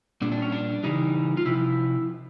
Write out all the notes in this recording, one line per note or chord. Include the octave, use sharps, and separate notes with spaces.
A#2 G3 D4
D4
C#4
D4
C#3 E3 G3 D#4
F4
C3 F3 E4